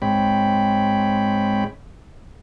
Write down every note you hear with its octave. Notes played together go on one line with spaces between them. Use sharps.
G#2 G#3 C4 C#5 G5 B5